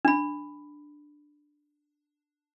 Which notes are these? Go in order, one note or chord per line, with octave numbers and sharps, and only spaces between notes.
D4 B5